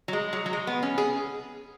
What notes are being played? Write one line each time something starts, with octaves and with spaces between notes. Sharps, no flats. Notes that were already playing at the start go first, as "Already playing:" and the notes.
F#3
G#3
F#3
F#3
G#3
B3
C#4
G#4